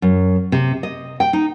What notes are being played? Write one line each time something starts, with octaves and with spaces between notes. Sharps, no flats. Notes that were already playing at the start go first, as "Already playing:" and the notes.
F#2
C3
D#5
G5
D#4